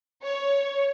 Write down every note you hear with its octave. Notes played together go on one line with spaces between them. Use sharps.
C#5